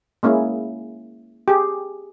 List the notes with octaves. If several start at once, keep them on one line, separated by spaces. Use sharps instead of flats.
G#3 A#3 C#4 E4 G#4
G4 G#4